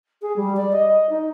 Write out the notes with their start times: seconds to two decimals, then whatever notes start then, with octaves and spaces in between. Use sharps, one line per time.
0.22 G#4
0.36 G3
0.57 D5
0.72 D#5
1.10 D#4